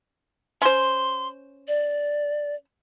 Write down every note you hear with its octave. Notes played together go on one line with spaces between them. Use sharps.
C#4 C5 C6
D5